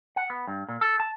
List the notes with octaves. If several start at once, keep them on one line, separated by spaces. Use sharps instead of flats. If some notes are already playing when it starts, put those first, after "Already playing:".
F#5
B3
G2
A#2
A4
A5